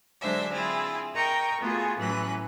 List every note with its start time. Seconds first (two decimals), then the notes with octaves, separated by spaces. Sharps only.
0.21 D3 F#3 G#3 D4 C5 E5
0.53 C4 E4 F4 G#4
1.15 A#4 D#5 G5 A#5 C#6
1.61 A3 B3 F4 F#4 G#4
1.98 A2 E3 F#3 C#4 B4 F#6